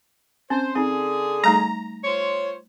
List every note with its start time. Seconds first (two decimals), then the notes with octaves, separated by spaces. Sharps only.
0.50 C4 C#4 C5
0.76 D3 C4 D#4 G#4
1.44 G3 A3 D#4 A#5
2.04 F4 C5 C#5